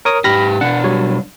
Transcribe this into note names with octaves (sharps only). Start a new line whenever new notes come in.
A#4 C#5 D#6
G#2 G4 B5 F6 A#6
B2 D4 F#5
F#3 G3 C#5